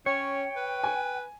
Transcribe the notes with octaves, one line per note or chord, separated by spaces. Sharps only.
C#4 C#5 G5
B4
G#5